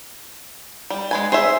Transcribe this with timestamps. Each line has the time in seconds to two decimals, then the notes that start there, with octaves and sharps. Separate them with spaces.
0.90 G3
1.11 G#3 B4 G#5
1.32 G#4 C5 C#5 E5